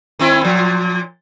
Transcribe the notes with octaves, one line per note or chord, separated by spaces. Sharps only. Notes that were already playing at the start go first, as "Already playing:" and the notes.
D#3 C4 E4
A#2 F3